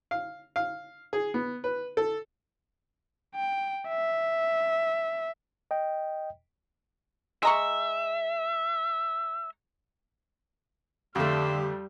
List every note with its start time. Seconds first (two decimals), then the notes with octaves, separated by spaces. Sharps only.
0.11 F5
0.56 F5
1.13 G#4
1.34 B3
1.64 B4
1.97 A4
3.35 G5
3.89 E5
5.71 D#5 G5
7.43 G#3 E5 A#5 C#6
11.15 F2 D3 A3 G4 F5 C6 E6
11.55 G3